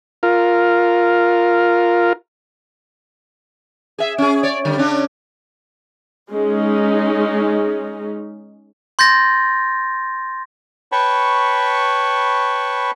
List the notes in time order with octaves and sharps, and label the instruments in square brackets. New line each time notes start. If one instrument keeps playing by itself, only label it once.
[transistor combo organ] F4 A#4
[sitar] G#4 E5
C#4 G#4
C#5 D5
D3 G3
C#3 C#4 D4
[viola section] G#3 C#4 D#4
[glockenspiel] C6 G6 A6 A#6
[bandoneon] B4 C#5 G5 A5 B5 C#6